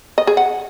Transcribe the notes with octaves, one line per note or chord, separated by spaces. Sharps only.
D#5
G#4
F#5